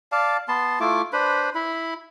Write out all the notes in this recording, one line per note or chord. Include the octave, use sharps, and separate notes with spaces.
D5 F5 A5
B3 A5 C6
A3 E4 F4 D6
D4 B4 C5 B5
E4 B5